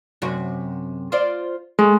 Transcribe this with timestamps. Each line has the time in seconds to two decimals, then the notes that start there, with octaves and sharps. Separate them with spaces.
0.22 F#2 C3 F#4
1.12 F4 C5 D5
1.79 G#3 A3